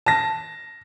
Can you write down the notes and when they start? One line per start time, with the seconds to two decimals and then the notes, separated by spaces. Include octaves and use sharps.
0.06 A5 A#6